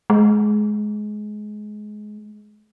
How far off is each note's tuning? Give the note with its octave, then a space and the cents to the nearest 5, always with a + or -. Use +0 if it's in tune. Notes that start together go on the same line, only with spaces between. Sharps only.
G#3 +20